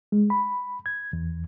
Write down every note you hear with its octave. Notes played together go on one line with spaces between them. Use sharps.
G#3
B5
G#6
E2